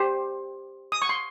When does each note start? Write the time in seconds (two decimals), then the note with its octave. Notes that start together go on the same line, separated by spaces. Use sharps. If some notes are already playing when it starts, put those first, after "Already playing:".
Already playing: G4 C5
0.92 D#6
1.02 C#6
1.09 C6